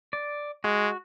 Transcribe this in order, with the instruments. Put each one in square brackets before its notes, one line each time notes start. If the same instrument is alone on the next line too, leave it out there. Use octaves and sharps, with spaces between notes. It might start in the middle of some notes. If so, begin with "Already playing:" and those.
[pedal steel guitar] D5
[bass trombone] G#3 [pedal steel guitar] F#4